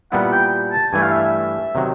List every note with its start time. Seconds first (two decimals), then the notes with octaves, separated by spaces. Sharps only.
0.12 A#2 G3 B3 E4 F#5
0.32 G5
0.72 A5
0.93 G2 E3 A3 G#5
1.02 F5
1.12 E5
1.23 E5
1.75 C3 D#3 F#3